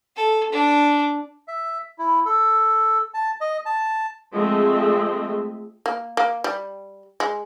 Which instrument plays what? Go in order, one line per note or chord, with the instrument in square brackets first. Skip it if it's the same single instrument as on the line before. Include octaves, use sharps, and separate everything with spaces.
[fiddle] A4
D4
[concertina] E5
E4
A4
A5
D#5
A5
[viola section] F3 G#3 A3 C4 D#5 E5
[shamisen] A#3
A#3
G3
G#3